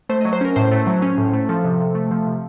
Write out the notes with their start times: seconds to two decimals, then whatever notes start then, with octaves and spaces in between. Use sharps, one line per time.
0.09 A3 C5
0.21 F#3 D#5
0.33 C5
0.41 C#4 A#4
0.56 A2 C5
0.71 A3
0.87 F#3
1.02 C#4
1.18 A2
1.34 A3
1.49 F3 A4
1.64 C3
1.80 C3
1.95 A3
2.11 F3
2.27 C3